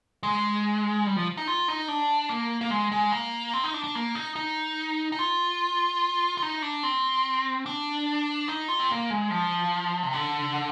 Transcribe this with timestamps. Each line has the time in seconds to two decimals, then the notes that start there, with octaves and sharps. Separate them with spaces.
0.23 G#3
1.06 G3
1.16 F3
1.37 D#4
1.48 F4
1.68 D#4
1.88 D4
2.29 A#3
2.61 A#3
2.70 G#3
2.92 G#3
3.12 A#3
3.54 C4
3.64 D#4
3.74 D4
3.84 D4
3.95 A#3
4.15 D#4
4.36 D#4
5.12 D#4
5.19 F4
6.37 F4
6.42 D#4
6.62 D4
6.83 C4
7.66 D4
8.48 D#4
8.68 F4
8.80 C4
8.89 A#3
9.10 G#3
9.30 F3
10.03 C3
10.13 D3